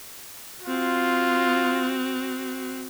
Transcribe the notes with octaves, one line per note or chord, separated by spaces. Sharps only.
C4 F4 F#4